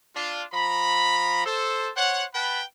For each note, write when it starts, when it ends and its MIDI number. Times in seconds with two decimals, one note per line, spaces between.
0.16 0.44 62
0.16 0.44 65
0.53 1.45 53
0.53 1.45 82
0.53 1.45 83
1.45 1.90 69
1.45 1.90 72
1.97 2.25 72
1.97 2.25 73
1.97 2.25 78
2.34 2.62 71
2.34 2.62 78
2.34 2.62 79
2.34 2.62 81
2.34 2.62 83